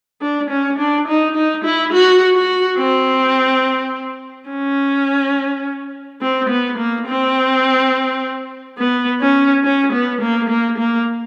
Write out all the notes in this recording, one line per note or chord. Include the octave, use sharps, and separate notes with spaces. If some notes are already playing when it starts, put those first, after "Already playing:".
D4
C#4
D4
D#4
D#4
E4
F#4
F#4
C4
C#4
C4
B3
A#3
C4
B3
C#4
C#4
B3
A#3
A#3
A#3